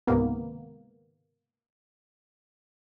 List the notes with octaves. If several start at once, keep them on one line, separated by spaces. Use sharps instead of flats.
C#2 G#2 C3 D#3 A#3 B3